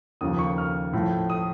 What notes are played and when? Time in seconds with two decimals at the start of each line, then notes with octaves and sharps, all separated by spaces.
0.21 D#2 C#3 F3 D#6
0.39 C#6
0.58 F6
0.93 A2 F3 A3
1.30 D#6